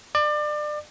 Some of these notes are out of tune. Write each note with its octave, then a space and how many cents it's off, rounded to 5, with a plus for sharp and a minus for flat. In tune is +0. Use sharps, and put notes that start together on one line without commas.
D5 +30